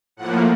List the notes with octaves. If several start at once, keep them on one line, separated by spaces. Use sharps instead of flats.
A2 F3 A#3 F#5